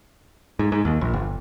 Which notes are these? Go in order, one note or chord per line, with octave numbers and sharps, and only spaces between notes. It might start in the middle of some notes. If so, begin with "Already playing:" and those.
G#2
G#2
D#2
A#1
G1